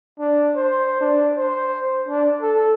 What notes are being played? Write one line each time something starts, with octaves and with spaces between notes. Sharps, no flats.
D4
C5
D4
C5
D4
A4